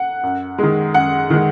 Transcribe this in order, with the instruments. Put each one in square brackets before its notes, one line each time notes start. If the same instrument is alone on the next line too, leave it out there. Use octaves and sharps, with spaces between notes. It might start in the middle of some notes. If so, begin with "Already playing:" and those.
Already playing: [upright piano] F#5
F#2
D#3 G#3
F#2 F#5
D#3 G#3